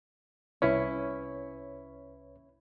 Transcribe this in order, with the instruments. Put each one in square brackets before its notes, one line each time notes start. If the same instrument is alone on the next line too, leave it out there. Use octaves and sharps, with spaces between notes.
[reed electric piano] C2 B4 C#5 [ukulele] C#4 E4